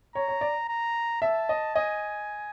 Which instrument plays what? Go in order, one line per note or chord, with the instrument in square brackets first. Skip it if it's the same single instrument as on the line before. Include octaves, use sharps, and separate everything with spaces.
[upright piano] C#5 [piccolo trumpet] A#5
[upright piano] C#5
D5
[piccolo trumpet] A#5
[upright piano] E5 [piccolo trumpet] A5
[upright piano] D#5
[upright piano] D#5 [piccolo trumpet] G#5